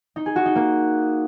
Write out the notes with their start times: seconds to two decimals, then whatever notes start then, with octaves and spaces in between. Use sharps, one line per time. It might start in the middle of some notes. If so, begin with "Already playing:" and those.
0.16 D#4
0.26 G#4
0.36 F#4
0.46 D#4
0.55 A#3